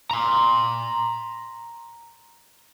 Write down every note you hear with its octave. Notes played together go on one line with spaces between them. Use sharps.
A#5 C6